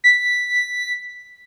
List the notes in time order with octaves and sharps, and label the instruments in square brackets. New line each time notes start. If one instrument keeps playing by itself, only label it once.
[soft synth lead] B6